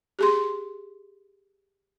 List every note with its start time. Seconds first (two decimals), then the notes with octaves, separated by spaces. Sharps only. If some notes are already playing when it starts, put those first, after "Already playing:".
0.19 G4 G#4 C6